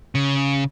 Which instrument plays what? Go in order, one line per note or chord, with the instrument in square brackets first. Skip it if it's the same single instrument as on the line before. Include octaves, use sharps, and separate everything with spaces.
[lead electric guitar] C#3